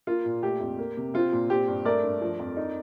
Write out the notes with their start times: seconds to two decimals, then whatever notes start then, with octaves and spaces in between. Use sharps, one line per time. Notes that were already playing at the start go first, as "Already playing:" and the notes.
0.07 A#3 F4
0.25 A#2
0.42 A3 G4
0.60 F2
0.79 A#3
0.97 C3
1.14 C4 F4
1.32 A#2
1.50 C4 G4
1.68 G2
1.85 A3 A#4 D5
2.04 G2
2.21 F3
2.39 F2
2.57 D#4